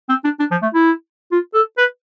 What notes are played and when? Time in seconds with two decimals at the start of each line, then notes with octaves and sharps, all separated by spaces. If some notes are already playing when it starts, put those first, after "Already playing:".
0.09 C4
0.24 D4
0.40 D4
0.51 F3
0.62 A3
0.74 E4
1.31 F4
1.54 A4
1.78 B4